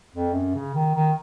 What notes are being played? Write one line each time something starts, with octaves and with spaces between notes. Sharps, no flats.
F2
F#2
C#3
D#3
D#3